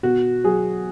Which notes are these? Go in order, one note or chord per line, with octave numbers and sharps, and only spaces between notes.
B2 F#4
F#3 G#4